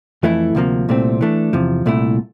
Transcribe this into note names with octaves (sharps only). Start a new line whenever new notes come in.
F2 E3 A3 E4
D2 C3 F3 A#3
C2 A#2 A3 C4
E3 A3 D4
E2 C3 F3
C2 A#2 A3 E4